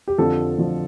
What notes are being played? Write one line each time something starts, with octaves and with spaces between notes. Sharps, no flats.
G4
F2 D3 F3 A4
F2 D3 F3